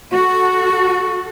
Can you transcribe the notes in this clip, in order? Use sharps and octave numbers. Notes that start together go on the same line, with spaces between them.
F#4 A4 C#6